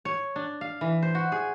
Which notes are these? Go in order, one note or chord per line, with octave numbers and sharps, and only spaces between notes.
C#5
D4
F5
E3
C5
F#4
G#4